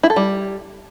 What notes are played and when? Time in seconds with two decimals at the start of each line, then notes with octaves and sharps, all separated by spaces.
0.03 E4
0.10 A4
0.16 G3